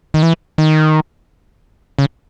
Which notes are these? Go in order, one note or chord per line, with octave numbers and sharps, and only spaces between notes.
D#3
E3
D#3
C#3